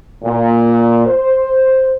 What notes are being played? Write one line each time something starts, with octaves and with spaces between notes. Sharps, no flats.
A#2
C5